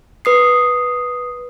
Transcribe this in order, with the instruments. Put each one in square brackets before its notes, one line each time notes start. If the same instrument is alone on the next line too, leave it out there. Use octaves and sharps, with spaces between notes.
[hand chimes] B4 D#6 C7